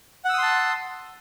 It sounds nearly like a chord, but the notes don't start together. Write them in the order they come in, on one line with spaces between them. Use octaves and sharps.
F#5 E6 D#6 C6 A5